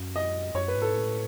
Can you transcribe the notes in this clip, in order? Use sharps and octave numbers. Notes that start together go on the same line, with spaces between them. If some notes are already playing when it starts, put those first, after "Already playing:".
Already playing: F#2
D#5
F#2 C#5
B4
G#2
A4
A2